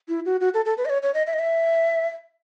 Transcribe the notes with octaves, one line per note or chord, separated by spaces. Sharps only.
E4
F#4
F#4
A4
A4
B4
D#5
C#5
C#5
D#5
E5
D#5
E5